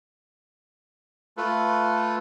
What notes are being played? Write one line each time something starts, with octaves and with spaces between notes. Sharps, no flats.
A3 F4 A4 B4